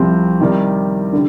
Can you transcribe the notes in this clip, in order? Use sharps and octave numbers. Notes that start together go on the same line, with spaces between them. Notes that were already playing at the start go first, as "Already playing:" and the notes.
Already playing: C2 C3 F3 C4
C3 D#3 G3
D3